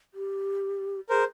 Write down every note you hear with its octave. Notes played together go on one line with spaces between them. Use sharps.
G4
G#4 A#4 C5